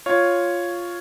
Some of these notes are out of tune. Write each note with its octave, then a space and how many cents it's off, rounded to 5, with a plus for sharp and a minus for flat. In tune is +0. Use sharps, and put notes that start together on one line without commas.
F4 +0 C#5 +0